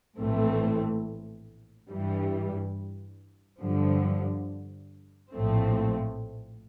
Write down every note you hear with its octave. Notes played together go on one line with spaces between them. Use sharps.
A#1 A2 E3 A3 C4
G2 E3 G3
G2 D3 F3
A#1 A2 F3 A3 C4